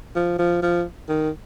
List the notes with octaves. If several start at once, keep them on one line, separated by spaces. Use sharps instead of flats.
F3
F3
F3
D#3